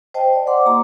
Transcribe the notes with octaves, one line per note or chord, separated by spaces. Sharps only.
C5 D#5 G5 A5
D5 D#5
C5 F#5 C6 D6
A#3 E4 G4 A#5